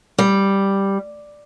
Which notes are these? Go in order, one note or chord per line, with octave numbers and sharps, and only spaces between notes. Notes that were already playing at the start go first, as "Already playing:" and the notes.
G3